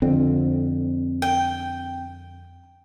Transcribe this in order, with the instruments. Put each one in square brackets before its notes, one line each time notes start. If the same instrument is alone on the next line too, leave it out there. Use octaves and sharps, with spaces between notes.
[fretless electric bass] F2 D3 [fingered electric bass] C4
[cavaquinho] G5